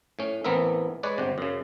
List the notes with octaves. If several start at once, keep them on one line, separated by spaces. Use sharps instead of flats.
A2 C#4
A1 E3 B3 C4 A#4 E5
G#3 B4 C#5 D5
G1 C3
F#2 C#3